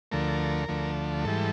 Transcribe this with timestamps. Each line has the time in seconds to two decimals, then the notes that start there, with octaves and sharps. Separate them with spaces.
0.12 D2 D3 F3 A3 A#4
0.68 D2 D3 F3 A3
1.25 G#2 E3 G3 A4